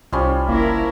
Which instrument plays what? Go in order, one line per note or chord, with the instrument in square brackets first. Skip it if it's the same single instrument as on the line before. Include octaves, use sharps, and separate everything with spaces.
[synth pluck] C2 [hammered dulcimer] F3 G3 C#4
[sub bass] F#1 [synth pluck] A#3 [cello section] E4 A#4